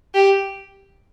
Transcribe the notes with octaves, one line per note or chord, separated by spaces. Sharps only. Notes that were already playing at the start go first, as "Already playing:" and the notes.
G4